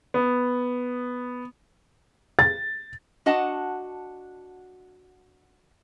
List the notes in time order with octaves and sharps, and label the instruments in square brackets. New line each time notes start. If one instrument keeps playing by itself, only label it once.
[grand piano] B3
[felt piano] A6
[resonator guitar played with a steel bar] D4 F#4 D#5 F#5 A5